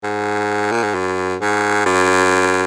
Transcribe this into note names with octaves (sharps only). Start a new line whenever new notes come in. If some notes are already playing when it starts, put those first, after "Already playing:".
G#2
A#2
G#2
F#2
G#2
F#2